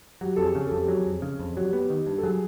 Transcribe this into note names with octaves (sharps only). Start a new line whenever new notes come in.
F#3 G4
F2 A4
G#4
C#3
F2 G4 A4
F#3 G#4
F2
C#3
F2
F#3 G4
B3
D#3
G2
A4
F#3 G#4